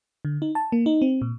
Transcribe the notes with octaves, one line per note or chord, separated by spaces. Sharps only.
D3
D#4
A5
A#3
D#4
C4
A#2